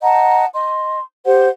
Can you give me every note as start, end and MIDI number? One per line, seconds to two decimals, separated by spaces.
0.03 0.45 75
0.03 0.45 78
0.03 0.45 81
0.03 0.45 82
0.54 1.00 75
0.54 1.00 84
1.25 1.48 67
1.25 1.48 72
1.25 1.48 78